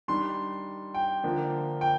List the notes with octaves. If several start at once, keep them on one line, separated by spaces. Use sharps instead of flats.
D#3 G3 D4 C6
G5
D3 F3 A#3 D4
G5